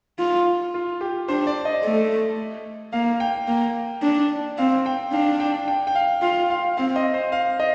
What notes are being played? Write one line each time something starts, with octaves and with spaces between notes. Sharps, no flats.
F4
F4
G4
D4 C5
D5
D#5
A3
A#3 F5
G5
A#3
D4
C4 F5
G5
D4 F5
G5
G5
G5
F5
F4 F5
F5
C4 F5
D#5
C5
F5
D#5